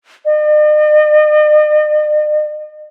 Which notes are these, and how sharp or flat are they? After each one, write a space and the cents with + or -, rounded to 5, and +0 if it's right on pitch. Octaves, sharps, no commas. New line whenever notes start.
D#5 -45